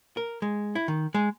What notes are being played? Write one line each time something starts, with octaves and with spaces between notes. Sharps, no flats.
A#4
G#3
E4
D#3
G#3